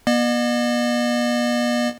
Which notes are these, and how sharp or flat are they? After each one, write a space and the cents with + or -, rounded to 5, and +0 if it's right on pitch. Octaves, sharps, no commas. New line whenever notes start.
B3 -45 D#5 -45